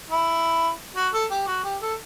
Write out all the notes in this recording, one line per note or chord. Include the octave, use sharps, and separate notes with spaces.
E4
F#4
A4
G4
F#4
G4
A4